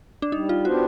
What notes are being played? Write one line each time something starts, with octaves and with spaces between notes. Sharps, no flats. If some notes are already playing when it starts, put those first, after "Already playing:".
D4
G3 D#4
F4
B3 D4 F#4 G4 C5